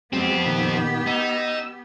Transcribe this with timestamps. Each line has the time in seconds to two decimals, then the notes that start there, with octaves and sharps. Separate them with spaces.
0.13 F2 F#3 G#3 B3 C4 G4
0.46 A#2 D#3
1.07 D#4 E6